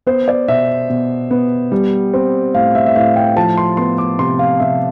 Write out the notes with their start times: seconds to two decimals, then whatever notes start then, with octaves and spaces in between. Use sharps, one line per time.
0.07 B3 C5
0.28 D5
0.48 B2 E5
0.90 B2
1.31 B3
1.72 G3
2.14 C4
2.55 A2 F5
2.75 E5
2.86 E5
2.96 A2 F5
3.16 G5
3.36 F3 A5
3.57 C6
3.77 B3 C6
3.98 D6
4.19 C3 C6
4.39 F5
4.60 C3 E5